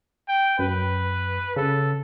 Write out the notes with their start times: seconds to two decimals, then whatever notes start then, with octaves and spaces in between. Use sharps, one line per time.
0.28 G5
0.59 F#2 B4
1.56 C#3 A4